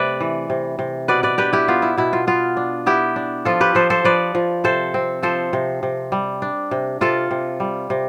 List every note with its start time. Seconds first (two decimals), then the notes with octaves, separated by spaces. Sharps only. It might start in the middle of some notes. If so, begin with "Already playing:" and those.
Already playing: C3 A3 B4 D5 E5
0.21 E3
0.50 C3
0.79 C3
1.08 B2 B4 D5
1.23 B4 D5
1.38 D4 G4 B4
1.53 E4 G4
1.68 B3 F4
1.82 E4
1.98 B2 E4
2.13 F4
2.27 B3 F4
2.57 D4
2.86 B3 E4 G4
3.16 D4
3.45 F3 F4 A4
3.61 G4 B4
3.75 F3 A4 C5
3.90 A4 C5
4.04 F3 B4 D5
4.35 F3
4.64 C3 A4 C5
4.94 C4
5.23 F3 A4 C5
5.53 C3
5.83 C3
6.12 G3
6.42 D4
6.71 C3
7.01 C3 F4 A4
7.31 C3
7.60 G3
7.90 C3